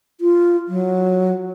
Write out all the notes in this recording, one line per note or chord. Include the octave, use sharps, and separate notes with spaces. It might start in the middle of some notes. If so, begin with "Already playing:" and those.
F4
F#3